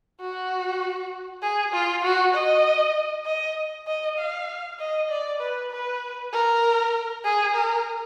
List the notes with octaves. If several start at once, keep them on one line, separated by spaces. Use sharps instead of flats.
F#4
G#4
F4
F#4
D#5
D#5
D#5
F5
D#5
D5
B4
B4
A#4
G#4
A#4